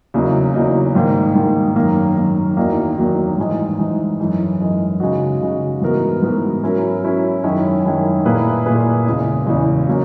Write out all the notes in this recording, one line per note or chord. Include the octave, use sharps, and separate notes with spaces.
E2 C#3 F#3 A#3 D#4
E2 C#3 F#3 A#3 D#4
G#2 D#3 A#3
G#2 D#3 A#3
F#2 D#3 A#3
F#2 D#3 A#3
E2 D#3 F#3 A#3 D#4
E2 D#3 F#3 A#3 D#4
G#2 E3 G#3 D#4
G#2 E3 G#3 D#4
F#2 E3 G#3 D#4
F#2 E3 G#3 D#4
C#3 G#3 D#4 F#4
C#3 G#3 D#4 F#4
G#2 E3 B3 F#4 A#4
G#2 E3 B3 F#4 A#4
F#3 C#4 E4 A#4
F#3 C#4 E4 A#4
F#2 D#3 G#3 C#4 E4
F#2 D#3 G#3 C#4 E4
A#2 A#3 E4 G#4 B4
A#2 A#3 E4 G#4 B4
E2 C#3 E3 G#3
E2 C#3 E3 G#3
F#3 A#3 C#4